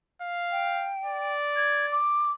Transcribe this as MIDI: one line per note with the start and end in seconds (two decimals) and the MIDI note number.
0.22 0.93 77
0.52 1.33 79
1.03 1.99 74
1.56 1.86 92
1.92 2.31 86